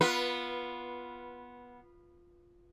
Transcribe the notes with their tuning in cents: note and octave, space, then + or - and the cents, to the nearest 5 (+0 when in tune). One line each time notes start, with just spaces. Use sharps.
B3 -10 F4 +0 B4 -20